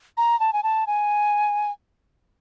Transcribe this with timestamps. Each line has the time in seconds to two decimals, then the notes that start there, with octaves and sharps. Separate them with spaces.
0.17 A#5
0.40 A5
0.53 G#5
0.63 A5
0.87 G#5